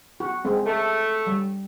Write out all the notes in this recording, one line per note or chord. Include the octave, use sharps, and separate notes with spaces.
F#4
G#3 C4
A3 A4
G3